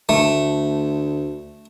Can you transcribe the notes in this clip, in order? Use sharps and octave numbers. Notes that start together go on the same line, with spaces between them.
D2 A3